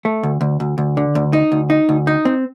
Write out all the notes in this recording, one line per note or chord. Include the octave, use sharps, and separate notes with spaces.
A3
D2
D2
D2
D2
D3
D2
D#4
D2
D#4
D2
D#4
C4